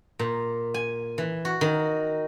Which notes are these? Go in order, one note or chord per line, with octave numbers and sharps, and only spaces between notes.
A#2
G#5
E3
F#4
D#3